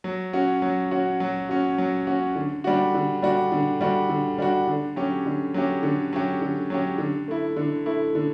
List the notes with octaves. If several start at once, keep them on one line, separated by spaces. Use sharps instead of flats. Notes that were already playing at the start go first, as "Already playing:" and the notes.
F#3
C#4 F#4
F#3
C#4 F#4
F#3
C#4 F#4
F#3
C#4 F#4
D3
G3 D4 F#4
D3
G3 D4 F#4
D3
G3 D4 F#4
D3
G3 D4 F#4
D3
F#3 C#4 G4
D3
F#3 C#4 G4
D3
F#3 C#4 G4
D3
F#3 C#4 G4
D3
A3 E4
D3
A3 E4
D3